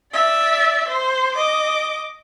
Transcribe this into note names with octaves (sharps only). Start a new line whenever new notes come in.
D5 E5
C5
D#5 D6